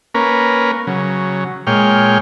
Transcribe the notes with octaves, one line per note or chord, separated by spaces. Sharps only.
A#3 C#4 A#4 B4
C#3 F#3
A#2 G#3 C#5 G5 F6